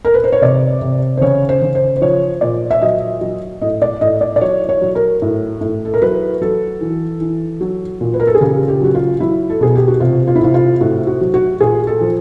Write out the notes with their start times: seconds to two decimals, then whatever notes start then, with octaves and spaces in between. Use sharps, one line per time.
0.05 A#4
0.14 B4
0.24 C5
0.32 C#5
0.42 C3 D5
0.81 C3
1.17 C5
1.21 C#3 C#5
1.49 C5
1.62 C#3
1.75 C5
1.96 C5
2.01 F3 C#5
2.41 A#2 D5
2.71 E5
2.82 F#3 D#5
3.21 F#3
3.61 A2 D#5
3.82 D5
4.01 A2 D#5
4.21 D5
4.36 D5
4.41 F#3 C#5
4.69 C#5
4.81 F#3
4.95 A#4
5.22 A2
5.61 A2
5.85 A4
5.94 A#4
6.02 F#3 B4
6.42 F#3 A4
6.81 E3
7.21 E3
7.61 F#3
8.01 A#2
8.14 B4
8.20 A#4
8.27 A4
8.35 G#4
8.41 C#3 G4
8.68 G4
8.81 F#3 F#4
8.95 F4
9.20 F#3 E4
9.50 A4
9.61 B2 G#4
9.75 G4
9.88 F#4
10.00 C3 F4
10.28 F4
10.35 E4
10.41 C3 F4
10.54 F4
10.81 A2 F#4
11.07 F#4
11.21 F#3
11.34 F#4
11.60 A#2 G#4
11.87 A4
12.01 F3